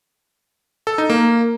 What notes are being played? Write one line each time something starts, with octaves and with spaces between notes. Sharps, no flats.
A4
D#4
A#3